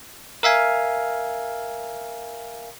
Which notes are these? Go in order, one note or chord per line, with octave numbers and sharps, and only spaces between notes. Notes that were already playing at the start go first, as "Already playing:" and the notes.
A#4 E5 F5 G#5